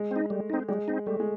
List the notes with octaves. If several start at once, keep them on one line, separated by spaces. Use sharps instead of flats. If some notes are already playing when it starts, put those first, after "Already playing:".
Already playing: G#3
C4 D#4
G3 A3
C4 D#4
G3 G#3
C4 D#4
G3 A3
G#3